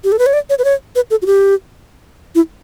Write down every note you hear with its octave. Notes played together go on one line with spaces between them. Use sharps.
G4
A4
B4
C#5
D5
C#5
B4
C#5
B4
A4
F#4
G4
E4